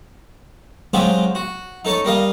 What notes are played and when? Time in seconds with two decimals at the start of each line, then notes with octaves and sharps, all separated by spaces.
0.94 F#3 G#3 C4 F4 G4 G#4
1.35 F#4
1.85 D#4 A4 C#5 A5 C#6
2.05 G3 A#4 D#5 F5